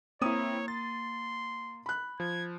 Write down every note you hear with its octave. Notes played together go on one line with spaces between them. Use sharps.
A#3 C4 E4 C#5 D#6 D#7
C6 A6
B5 F#6
F3 G#6